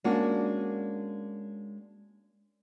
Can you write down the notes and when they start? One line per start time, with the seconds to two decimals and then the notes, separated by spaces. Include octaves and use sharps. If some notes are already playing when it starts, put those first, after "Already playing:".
0.04 G#3 A#3 C#4 D4 F#4